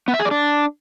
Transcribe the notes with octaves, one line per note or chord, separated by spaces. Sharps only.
B3
E5
G#4
D5
D4